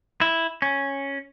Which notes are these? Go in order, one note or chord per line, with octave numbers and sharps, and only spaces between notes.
E4
C#4